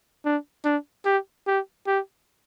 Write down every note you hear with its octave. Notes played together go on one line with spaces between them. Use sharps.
D4
D4
G4
G4
G4